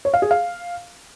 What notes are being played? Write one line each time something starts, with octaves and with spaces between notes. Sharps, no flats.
C#5
F5
G#4
F5